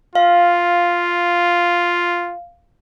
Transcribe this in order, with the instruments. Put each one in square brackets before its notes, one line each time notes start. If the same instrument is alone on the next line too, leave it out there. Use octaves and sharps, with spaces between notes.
[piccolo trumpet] F4 [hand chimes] F5